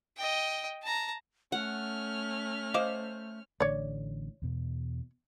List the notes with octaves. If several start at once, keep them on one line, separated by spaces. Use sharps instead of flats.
D#5 G5
A5 A#5
A3 C#4 F#5 F6
C5 D#5 F5 D6
A1 D3 A3 C#5 D5
E2 B2